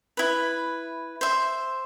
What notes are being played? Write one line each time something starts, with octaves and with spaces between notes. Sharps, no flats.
E4 B4
C5 E5